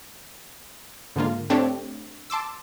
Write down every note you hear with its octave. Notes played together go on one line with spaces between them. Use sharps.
G#2 D3 A#3 F4
A3 C4 D4 G4 C#5
A5 C6 D6 E6